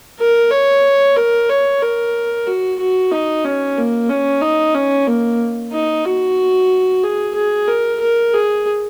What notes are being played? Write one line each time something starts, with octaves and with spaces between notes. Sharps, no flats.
A#4
C#5
A#4
C#5
A#4
F#4
F#4
D#4
C#4
A#3
C#4
D#4
C#4
A#3
D#4
F#4
G#4
G#4
A#4
A#4
G#4